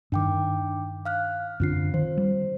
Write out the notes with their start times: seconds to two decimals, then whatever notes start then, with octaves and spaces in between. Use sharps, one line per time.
0.12 G2 D#3 D4 G5 D6
1.05 F5 F6 F#6
1.60 F#2 D3 C4 D4 F4 C7
1.94 D#3 C5
2.17 G3